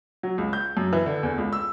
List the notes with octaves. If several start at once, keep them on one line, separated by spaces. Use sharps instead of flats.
F#3
C#2
G6
F#2
E3
D3
E2
C#2
E6